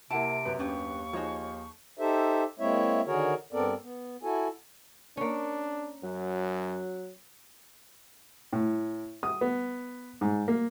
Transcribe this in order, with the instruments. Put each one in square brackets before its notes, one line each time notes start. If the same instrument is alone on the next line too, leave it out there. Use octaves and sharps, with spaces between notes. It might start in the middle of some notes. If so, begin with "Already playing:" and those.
[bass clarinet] C3 [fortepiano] A#3 E4 [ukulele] F#5 A5 [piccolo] D7
[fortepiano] F#2 B3
[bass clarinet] D#2 [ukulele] C#4 D4 G4 [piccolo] C#6
[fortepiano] F3 D#4 G#4 [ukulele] F#4 C#5
[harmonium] D#4 G4 A4 C5 E5
G#3 A#3 C4 E4 C#5 E5
D3 D#3 F#4 G#4 A#4 C#5
G2 B3 C4 A4 A#4 D5
B3
E4 F#4 A4 G#5
[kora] A#3 C#4 [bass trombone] D4
[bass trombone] F#2 [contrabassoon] F#3
[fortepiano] A2
D#6
B3
G#2
A#3